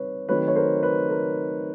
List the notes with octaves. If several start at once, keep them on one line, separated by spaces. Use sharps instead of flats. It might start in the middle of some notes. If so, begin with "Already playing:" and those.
Already playing: G3 C4 D#4 B4 C#5
D#3 F#3 A3 C4 D#4 B4 C#5
C#5
A#4 C5
B4
A#4